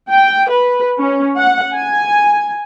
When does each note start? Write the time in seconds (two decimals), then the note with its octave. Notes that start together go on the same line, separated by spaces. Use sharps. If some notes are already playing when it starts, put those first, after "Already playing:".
0.10 G5
0.51 B4
1.00 C#4
1.37 F#5
1.75 G#5